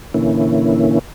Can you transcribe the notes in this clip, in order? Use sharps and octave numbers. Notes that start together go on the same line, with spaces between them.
A#2 D3 E3 A#3 C#4 E4